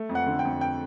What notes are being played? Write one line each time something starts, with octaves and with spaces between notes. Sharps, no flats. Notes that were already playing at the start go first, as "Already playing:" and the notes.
Already playing: A3
F2
F#5
D3
G5
F2
G5